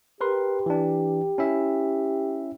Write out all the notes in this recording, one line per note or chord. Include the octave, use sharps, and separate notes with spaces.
G4 A#4 B4 C6
E3 D4
C#4 E4 E5